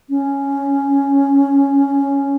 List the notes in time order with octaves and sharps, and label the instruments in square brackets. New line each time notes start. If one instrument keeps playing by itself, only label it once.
[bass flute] C#4